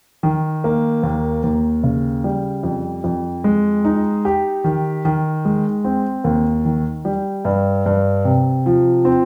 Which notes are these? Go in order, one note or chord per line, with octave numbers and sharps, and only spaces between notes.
D#3
A#3
D#2
D#2
C#3
G3
F2
F2
G#3
D#4
G4
D#3
D#3
G#3
C4
D#2
D#3
G3
G2
G2
C3
F3
C4